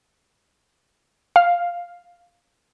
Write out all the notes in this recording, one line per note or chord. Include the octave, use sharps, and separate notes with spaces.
F5